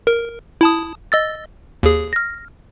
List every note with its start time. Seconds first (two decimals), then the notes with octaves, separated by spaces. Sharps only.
0.07 A#4
0.61 E4 A5 D#6
1.12 D#5 E6 A6
1.83 D#2 G#4
2.13 F6 A#6